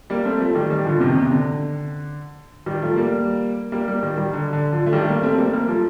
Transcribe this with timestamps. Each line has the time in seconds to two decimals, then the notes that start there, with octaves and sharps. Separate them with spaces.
0.10 G3 A#3
0.25 A3 C4
0.40 F3 A3
0.55 D#3 G3
0.70 D#3 G3
0.85 D3 F3
1.00 C3 D#3
1.15 C3
1.26 C3
1.31 D3
2.66 D#3 G3
2.82 F3 A3
2.96 G3 A#3
3.72 G3 A#3
3.88 G3 A#3
4.03 D#3 G3
4.17 D#3 G3
4.33 D3
4.53 D3
4.72 D3 F3
4.86 A3
4.93 D#3 G3
5.03 A3
5.08 G3 A#3
5.23 A3 C4
5.38 G3 A#3
5.46 C4
5.53 G3 A#3
5.68 F3 A3